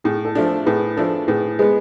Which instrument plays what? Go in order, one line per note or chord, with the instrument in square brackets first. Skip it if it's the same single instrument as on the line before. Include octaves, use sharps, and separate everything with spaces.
[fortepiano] A2 [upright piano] G#4
[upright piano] A4
[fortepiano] F3 A3 D4
[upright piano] A4
[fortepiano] A2 [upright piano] G#4 B4
[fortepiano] F3 A3 D4 [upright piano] A4
[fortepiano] A2 [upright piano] G#4 B4
[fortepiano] G#3 B3 [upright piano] G#4 B4